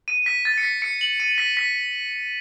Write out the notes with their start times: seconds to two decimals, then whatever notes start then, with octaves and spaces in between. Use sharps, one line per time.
0.08 D#7
0.26 B6
0.45 A6
0.58 C#7
0.63 B6
0.82 C#7
1.01 F#7
1.20 D#7
1.38 B6
1.57 B6